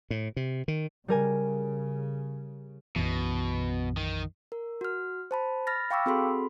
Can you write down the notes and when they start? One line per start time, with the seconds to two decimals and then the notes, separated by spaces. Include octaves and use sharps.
0.10 A2
0.36 C3
0.68 D#3
1.08 C#3 G3 A#4 G#5
2.96 B1 F#2 B2 E3
3.97 D#3
4.52 A#4
4.81 F#4 F6
5.31 C5 A5 B5
5.67 B5 F6 A6 A#6
5.91 F5 G5 B5 C#6 D6 E6
6.06 C4 F#4 G#4 A4 B5 C6